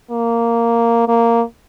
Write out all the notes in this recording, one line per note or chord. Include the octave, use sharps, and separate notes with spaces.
A#3
A#3